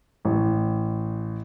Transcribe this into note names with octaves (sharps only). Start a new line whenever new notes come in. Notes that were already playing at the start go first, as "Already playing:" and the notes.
A1